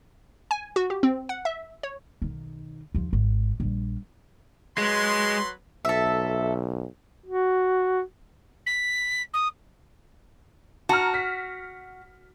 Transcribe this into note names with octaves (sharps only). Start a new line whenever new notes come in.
G#5
F#4
G4
C4
F#5
E5
C#5
B1 D#3
D#2 F3
G#1
A#1 G3
F#3 G#3 B4 C6
B1 A4 E5
F#4
B6
D#6
F#4 A5 A#5 F6
B6